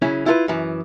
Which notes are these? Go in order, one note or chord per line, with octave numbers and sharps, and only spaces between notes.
C#3 F#3 C#4 E4
E4 F4 A4 B4
F#2 E3